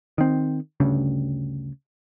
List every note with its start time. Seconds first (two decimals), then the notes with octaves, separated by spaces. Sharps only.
0.18 D#3 C4
0.80 D2 G2 C#3